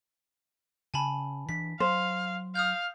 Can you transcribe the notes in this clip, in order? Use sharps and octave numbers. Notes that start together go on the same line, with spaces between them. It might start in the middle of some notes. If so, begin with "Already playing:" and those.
C#3 G#5 A5 B5
E3 D4 B6
F#3 C5 F5
F5 D#6 F6 G6